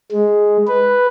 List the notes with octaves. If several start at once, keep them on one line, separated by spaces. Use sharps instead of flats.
G#3
B4